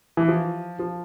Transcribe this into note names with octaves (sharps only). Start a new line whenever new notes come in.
E3
F3
F3